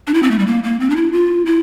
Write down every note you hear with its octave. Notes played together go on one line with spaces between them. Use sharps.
D4
E4
C4
A3
G3
A#3
A#3
C4
D4
E4
F4
E4